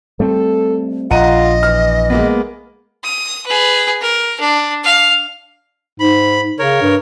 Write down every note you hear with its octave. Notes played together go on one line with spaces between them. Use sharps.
G3 A3 C4 A4
A#1 F4 D#5 F#5 A#5 D#7
E3 F6
G#3 A#3 B3
D#6
G#4 B4
A#4
D4
F5
G#2 B5
C#3 A#4 C#5
G2